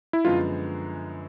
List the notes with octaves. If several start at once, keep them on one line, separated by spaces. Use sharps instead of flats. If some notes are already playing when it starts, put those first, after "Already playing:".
E4
F#2 D3 F3 G#3 B3 F4